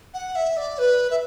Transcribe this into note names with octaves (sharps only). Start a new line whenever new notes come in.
F#5
E5
D5
B4
E5